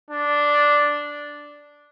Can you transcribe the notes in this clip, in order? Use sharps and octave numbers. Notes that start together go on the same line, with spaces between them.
D4